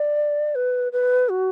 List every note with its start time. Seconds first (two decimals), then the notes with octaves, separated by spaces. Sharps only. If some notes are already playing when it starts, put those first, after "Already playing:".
Already playing: D5
0.55 B4
0.92 B4
1.29 F#4